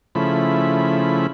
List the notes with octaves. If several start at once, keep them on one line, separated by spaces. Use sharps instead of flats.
C#3 F3 A3 E4 B5